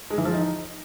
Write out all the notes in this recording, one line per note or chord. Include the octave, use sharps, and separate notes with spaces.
G#3
E3
F3
D#4